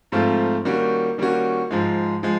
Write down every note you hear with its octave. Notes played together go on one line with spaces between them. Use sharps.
G#2 F3 A3 C4 F4
D#3 G3 A#3 C#4 F#4
D#3 G3 A#3 C#4 F#4
G#2 F3 G#3
F3 G#3